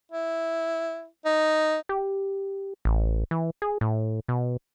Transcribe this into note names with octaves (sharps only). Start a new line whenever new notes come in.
E4
D#4
G4
A1
E3
G#4
A2
B2